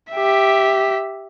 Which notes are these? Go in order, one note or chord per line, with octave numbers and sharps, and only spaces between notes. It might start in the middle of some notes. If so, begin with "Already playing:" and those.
G4 E5